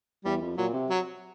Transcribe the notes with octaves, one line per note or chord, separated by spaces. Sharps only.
E2 G3
F2
A#2 F#3
C3
F#3